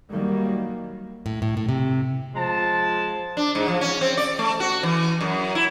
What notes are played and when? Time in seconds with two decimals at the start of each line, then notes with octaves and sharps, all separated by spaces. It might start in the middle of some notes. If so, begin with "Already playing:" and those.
0.12 D#3 F#3 G3 A#3
1.26 A2
1.42 A2
1.57 A2
1.69 C3
2.35 F3 G#3 A5
3.37 D4
3.55 G#2
3.68 F3
3.81 C#4
4.01 C4
4.17 D5
4.39 A3
4.60 F#4
4.83 E3
5.21 F#2
5.55 E4